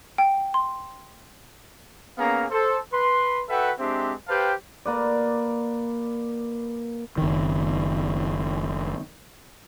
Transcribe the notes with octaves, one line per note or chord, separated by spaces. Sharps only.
G5
C6
A#3 B3 C#4 G#4 F5 A#5
A4 C5
B4 C6
F#4 A4 B4 E5 F#5 G5
G#3 C4 D4 G4 C5 E5
G4 B4 C5 F5 G5 A5
A#3 B4 D5
F#1 D#3